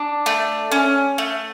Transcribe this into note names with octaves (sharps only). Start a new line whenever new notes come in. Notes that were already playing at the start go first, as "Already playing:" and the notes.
Already playing: D4
A3
C#4
A3